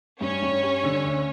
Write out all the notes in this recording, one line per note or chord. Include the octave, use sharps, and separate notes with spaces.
G2 C#4 C#5
G2
G3
D3
D2